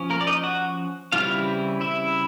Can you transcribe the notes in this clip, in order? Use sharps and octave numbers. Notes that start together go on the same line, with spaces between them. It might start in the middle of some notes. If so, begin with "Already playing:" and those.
Already playing: F3 C#4
A#3 A#4
D5
D#4 D#5
F#4 F#5
C#3 E3 G3 C4 E4 F4 F5
E4 E5